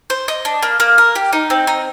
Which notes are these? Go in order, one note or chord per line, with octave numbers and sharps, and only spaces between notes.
C5
D#5
D4
A#3
A#3
A#4
G4
D#4
C4
D#4